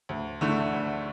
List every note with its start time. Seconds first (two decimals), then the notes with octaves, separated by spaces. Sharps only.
0.09 D2
0.41 D3 A3 E4
0.73 D2